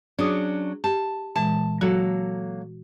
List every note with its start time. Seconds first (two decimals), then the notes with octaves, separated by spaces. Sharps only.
0.19 F#3 C#4 D4 G#4 D6 D#6
0.84 G4 A5
1.36 A#2 E3 G#3 A5
1.81 F#3 A#3 F#4 A4